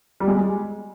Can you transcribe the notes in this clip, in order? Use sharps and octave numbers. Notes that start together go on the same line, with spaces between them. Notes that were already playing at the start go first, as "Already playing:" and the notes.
G3
G#3